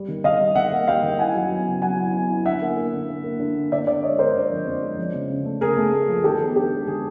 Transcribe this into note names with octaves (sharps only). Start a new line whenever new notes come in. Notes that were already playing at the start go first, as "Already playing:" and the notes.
Already playing: G3
D#3
D#3 D#5 F5
G3
D#3 E5 F#5
A#3
G3 F5 G5
D#3
E4 F#5 G#5
F#3
B3
C#3
F#3 F#5 G#5
E4
B3
E4
D3 E5 F#5
A#3
A#3
D3
A#3
A#3
D3
A#3
D3 D5 E5
D3 D5 E5
G#3 C#5 D#5
D3 A#4 C5
D3
F3
F2
G#3
F3
C#3
C#3
A3
C#3 G#4 A#4
A3
A3
F3
D#3 G4 A4
B3
D4 G4
G#3
D#3 G#4